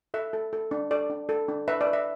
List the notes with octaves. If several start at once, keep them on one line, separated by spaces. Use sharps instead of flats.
A4 E5
A4
A4
D4
A4 D5
D4
A4
D4
B4 E5
D5
B4
E5